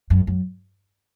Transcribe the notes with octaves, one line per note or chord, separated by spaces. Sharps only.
F#2
F#2